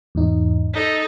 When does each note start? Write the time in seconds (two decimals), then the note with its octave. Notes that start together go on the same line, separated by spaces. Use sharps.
0.15 E2 G#2 D#4
0.73 D#4 A4 B6